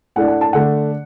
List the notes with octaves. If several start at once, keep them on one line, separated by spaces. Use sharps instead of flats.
A2 A3 D4 F#5
F#5
A5
D3 A3 D4 F#5